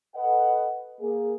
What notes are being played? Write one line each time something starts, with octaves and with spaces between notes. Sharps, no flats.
A4 B4 D#5 F#5
A#3 G#4